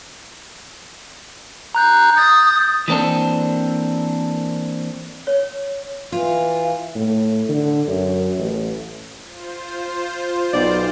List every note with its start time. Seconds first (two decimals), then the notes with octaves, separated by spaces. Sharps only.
1.75 A#5 F#6 G6
2.17 D#6 G6 A6
2.88 E3 A#3 C4 D4 A4
5.27 C#5
6.12 E3 F4
6.96 A2
7.49 D3
7.88 F#2
8.38 A1
9.23 F4 C5
10.53 B1 D5